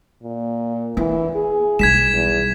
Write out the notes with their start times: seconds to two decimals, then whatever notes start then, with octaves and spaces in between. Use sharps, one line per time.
0.23 A#2
0.97 E3 B3
1.35 G#4
1.79 B1 G3 G#6 B6 E7
2.14 E2